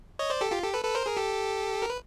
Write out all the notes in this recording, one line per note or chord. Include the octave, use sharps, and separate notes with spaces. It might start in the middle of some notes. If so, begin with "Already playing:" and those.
C#5 D#5
C5 D5
G4 A4
F4 G4
G4 A4
A4 B4
A4 B4
A#4 C5
G#4 A#4
G4 A4
A#4
B4